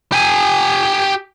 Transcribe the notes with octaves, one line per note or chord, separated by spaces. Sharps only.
G4 G#5